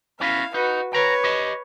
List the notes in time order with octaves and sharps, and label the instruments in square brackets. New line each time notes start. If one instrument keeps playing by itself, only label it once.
[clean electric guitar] B3 C#4 F#4 [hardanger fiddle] E4 F5
[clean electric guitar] D#4 [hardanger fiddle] F#4 B4
[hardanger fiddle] B4 C#5 [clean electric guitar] G5 A#5
[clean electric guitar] G4 D#5